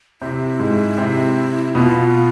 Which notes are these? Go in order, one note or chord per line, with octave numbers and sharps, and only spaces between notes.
C3 C4 E4
G#2 G#3
C3 C4
B2 B3 F4